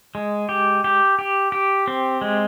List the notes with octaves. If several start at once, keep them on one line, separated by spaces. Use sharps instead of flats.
G#3
G4
G4
G4
G4
C4
G#3